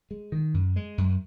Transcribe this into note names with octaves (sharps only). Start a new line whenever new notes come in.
G#3
D#3
F#2
G#3
F#2